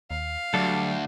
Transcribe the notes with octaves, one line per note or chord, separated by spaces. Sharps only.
D#2 F5
D2 F#3 G3 D4 A4